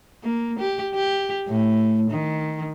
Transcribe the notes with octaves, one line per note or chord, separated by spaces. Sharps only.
A#3
G4
G4
A2
D#3